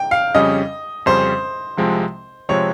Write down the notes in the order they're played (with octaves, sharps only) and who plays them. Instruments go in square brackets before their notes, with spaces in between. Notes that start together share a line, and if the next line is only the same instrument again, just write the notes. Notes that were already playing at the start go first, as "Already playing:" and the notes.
Already playing: [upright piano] G5
F5
[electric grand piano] F2 C#3 G3 C#4 [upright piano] D#5
[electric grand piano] F2 C#3 G3 C#4 [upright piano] C5
[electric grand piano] C2 C3 F3 G#3 C4
[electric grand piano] C3 F3 G#3 C4 [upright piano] C#5